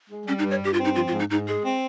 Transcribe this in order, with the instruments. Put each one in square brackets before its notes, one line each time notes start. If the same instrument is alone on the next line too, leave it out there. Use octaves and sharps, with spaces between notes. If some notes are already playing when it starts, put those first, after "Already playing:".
[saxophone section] G#3
[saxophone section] G3 [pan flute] C#4
[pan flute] D#4
[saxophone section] G2
[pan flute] C#5
[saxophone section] G2 [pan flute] G4
[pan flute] F4
[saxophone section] C4
[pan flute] D#4
[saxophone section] F3 [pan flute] F4
[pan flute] F4
[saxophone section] G#2
[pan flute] D#4
[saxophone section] G#2 [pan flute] D#4
[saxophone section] G#3 [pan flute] G#4
[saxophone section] C4